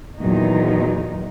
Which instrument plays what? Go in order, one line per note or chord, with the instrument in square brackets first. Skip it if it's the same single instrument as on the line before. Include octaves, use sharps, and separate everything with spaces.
[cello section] E2 A#2 D#3 F#3 D#4